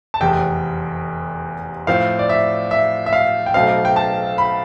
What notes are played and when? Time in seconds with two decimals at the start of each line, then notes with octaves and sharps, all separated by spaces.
0.14 A5
0.20 F1 E2 C3 G5
1.87 A2 F3 C4 F5
2.19 D5
2.29 E5
2.71 E5
3.06 E5
3.13 F5
3.46 G5
3.54 B1 B2 A3 C4 F5
3.85 G5
3.96 A5
4.38 B5